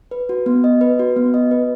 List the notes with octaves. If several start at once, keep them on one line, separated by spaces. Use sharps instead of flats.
B4
F#4
B3
D#5
B4
F#4
B3
D#5
B4